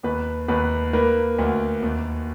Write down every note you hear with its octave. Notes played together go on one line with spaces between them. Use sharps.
D#2 B4
D#2 B4
A#3 B4
D2
D#2